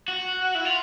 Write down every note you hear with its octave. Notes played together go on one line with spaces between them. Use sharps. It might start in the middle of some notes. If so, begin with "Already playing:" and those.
F#4
E4
F4